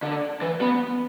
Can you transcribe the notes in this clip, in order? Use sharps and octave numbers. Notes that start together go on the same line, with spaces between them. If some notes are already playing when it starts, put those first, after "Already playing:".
D3
E3
B3